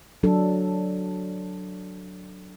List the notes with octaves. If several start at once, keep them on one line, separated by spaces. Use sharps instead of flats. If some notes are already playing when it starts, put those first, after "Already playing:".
F#3 D4 A4